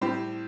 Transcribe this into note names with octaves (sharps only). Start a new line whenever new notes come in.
A2 G3 C4 G4 C5